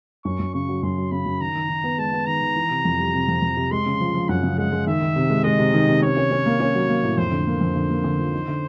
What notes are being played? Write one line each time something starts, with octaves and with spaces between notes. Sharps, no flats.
F#2 C#6
F#2
C#3 C#6
F#3
F#2 C6
F#3
C#3 B5
F#2
D#3 A#5
D#3
D#3
B3
G#3 A5
B3
D#3 A#5
D#3
E3
C3
F2
G3
C3
F2
F2
C3
G#3 C6
C#3
F3
F3
F#2 F#5
C#3
G#3 F#5
G#3
D#3 E5
D#3
C3
G#3
G#3 D#5
C3
D#3
C3
C#4 C#5
C#4
C#4
A#3
C#4
F#3
A#3
A2
F2 C5
D3
A#3
F2
D3
A#3
D3
F3
D#4
D3